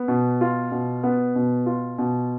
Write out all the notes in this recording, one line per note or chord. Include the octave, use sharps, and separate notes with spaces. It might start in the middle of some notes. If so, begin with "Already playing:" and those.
Already playing: B3
B2
F4
B2
B3
B2
F4
B2